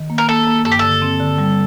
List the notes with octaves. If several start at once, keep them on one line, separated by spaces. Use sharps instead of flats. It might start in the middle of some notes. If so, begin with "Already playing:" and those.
Already playing: D#3
A#3
A#4
A#3 A4
A#3
G2 A4
G4
D3 A4
C4
D3
G3